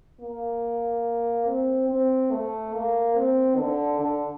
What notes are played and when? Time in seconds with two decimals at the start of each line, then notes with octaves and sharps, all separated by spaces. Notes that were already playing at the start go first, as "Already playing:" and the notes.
0.21 A#3
1.46 C4
1.89 C4
2.31 A3
2.73 A#3
3.16 C4
3.57 D3
4.00 D3